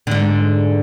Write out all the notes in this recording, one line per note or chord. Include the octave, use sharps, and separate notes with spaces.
G#2 D3